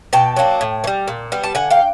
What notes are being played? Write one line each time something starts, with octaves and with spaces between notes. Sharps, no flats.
B2 G5 A5
F#3 A#3 D4
A2
E3
G3
A#2
G3 B3
A5
D3 F#5 G#5
F5 G5